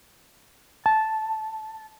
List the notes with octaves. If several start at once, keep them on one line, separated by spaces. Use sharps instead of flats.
A5